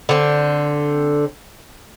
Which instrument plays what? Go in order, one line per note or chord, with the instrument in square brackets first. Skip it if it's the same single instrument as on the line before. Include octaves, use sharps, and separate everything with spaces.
[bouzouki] D3 C4